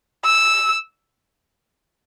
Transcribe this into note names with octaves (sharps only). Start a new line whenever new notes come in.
E6